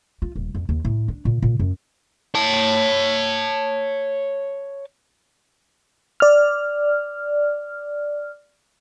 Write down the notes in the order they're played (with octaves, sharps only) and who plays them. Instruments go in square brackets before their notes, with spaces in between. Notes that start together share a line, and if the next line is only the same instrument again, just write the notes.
[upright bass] F4
D#1
F2
D#2
A2
D4
A#2
A#2
F#2
[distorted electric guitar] C#5 A5
[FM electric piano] D5 F6